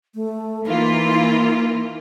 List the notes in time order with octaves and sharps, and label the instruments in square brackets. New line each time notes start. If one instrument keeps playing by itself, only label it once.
[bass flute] A3
[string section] E3 A#3 F4 [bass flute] D#4